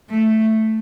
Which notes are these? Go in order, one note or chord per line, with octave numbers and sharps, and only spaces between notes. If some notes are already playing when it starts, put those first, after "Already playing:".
A3